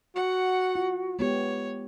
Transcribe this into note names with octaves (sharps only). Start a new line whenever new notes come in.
F#4 F#5
F4
G#3 B3 G4 C#5